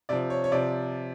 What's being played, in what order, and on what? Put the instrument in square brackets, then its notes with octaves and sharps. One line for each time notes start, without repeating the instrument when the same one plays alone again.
[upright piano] C3 F3 D5
C#5
C#5
C3 F3 D5